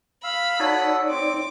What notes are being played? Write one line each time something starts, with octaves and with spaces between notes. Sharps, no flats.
F5 B5 E6
D#4 F#4 A4 C#5 D5 D#6
C4 D6